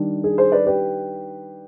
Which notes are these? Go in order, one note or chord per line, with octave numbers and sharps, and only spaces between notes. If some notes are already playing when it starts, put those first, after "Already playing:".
Already playing: D#3 G3 D4
G#4
G#4 C5
B4 D5
G4 B4